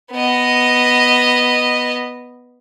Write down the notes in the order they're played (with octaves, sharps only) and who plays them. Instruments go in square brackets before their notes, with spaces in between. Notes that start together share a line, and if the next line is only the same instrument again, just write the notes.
[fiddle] B3 D#5